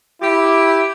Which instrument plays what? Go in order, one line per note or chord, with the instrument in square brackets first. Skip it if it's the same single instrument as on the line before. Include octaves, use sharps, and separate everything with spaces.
[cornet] E4 [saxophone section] G4